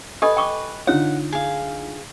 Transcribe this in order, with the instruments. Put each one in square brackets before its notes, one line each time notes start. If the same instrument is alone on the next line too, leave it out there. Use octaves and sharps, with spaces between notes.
[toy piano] G4 A4 D#5 [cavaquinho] B4 G#5
[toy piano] G5 C#6 D6
[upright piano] D3 D#4 F4 [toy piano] C#5 [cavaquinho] F#5
[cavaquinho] G#4 F5